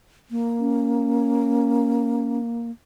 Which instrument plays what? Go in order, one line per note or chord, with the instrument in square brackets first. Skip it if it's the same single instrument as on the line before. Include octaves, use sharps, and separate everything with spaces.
[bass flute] A#3
[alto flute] C#4